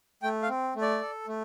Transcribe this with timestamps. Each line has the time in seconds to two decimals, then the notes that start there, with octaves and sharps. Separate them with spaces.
0.23 A3 G5
0.43 F5
0.48 C4
0.75 A3
0.82 D5
1.01 A4
1.27 A3